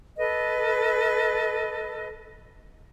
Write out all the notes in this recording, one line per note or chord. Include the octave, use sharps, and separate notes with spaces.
A4 B4 D#5